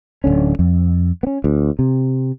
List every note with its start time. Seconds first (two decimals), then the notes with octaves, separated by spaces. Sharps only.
0.24 D1 G1 D3 C#4
0.59 F2
1.23 B3 C#4
1.44 D2
1.79 C3